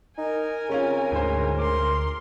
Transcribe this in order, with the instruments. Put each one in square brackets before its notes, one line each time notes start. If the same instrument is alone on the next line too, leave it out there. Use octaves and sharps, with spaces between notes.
[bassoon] D#4 [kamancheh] A#4 G#5
[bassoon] C#3 [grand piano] C4 C#4 F4
[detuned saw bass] D2 [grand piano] G#2 C5
[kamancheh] A#4 C6 [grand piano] D6